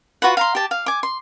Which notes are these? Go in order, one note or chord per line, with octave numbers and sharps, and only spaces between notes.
F4 F#4 B4 F#5
F5 A#5 C6
G4 A5
F5
G#5 D6
C6